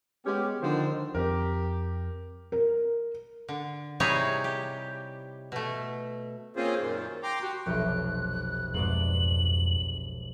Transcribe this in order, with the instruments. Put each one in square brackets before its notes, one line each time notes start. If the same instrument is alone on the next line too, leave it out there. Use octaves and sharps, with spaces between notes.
[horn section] G#3 B3 C#4 G4
D3 D#3 F3 D#4 A4 C5
[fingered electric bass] F2 [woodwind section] G4 [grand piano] A#4
[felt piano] A#4
[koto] D3
C3 G3 D#4 E4 G#4 C#5
G4
B2 A3
[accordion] A#3 C4 C#4 F4 G#4 C5
F#2 A#2 D#3
G5 A#5 C6 D6
F#4 G4
[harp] F1 B1 [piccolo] F#6
[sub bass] F2 [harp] G#2 B2 D5 [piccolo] F#7